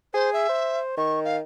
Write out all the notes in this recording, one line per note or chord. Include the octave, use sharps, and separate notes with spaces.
G#4 C5
E5
C5
D#3 C#6
F5